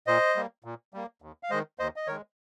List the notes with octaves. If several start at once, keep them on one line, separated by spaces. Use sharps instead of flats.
A#2 C5 D#5
G3 A#3
A#2
G3 A#3
D#2
F5
D#3 G#3 C5 D#5
D#2 C5 D#5
D#5
D#3 G#3 A#4 C#5